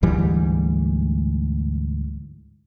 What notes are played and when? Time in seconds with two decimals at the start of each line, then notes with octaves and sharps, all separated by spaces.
0.03 D2 G#2 E3 G3